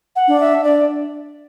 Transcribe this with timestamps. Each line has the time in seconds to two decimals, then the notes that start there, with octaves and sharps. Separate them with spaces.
0.16 F#5
0.28 D4
0.40 E5
0.64 D4 D5